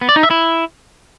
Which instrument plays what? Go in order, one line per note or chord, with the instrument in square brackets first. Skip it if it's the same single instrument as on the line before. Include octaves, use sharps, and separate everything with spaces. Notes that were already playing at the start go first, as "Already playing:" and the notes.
[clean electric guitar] B3
D5
D#4
E5
E4